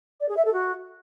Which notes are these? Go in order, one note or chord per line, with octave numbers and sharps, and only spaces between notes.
D5
G#4
E5
A4
F#4